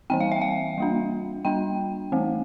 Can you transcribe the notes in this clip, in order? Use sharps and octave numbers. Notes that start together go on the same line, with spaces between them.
E3 G3 C4 G5
F5
E5
F5
G3 A#3 D4
G3 D4 G5
E3 A3 C4